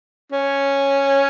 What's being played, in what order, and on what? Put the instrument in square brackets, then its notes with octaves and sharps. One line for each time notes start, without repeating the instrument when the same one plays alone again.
[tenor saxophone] C#4